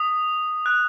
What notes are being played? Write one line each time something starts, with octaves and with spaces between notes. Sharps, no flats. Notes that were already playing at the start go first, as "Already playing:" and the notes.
Already playing: D#6
F#6